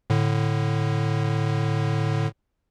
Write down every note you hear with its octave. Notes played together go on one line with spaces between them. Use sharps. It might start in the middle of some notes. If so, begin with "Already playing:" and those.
A2 D3